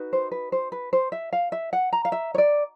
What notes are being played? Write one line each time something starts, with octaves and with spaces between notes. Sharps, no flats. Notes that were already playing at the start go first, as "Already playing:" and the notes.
Already playing: D#4 F#4 B4
C5
B4
C5
B4
C5
E5
F5
E5
F#5
A#5
F5
E5
C#5
D5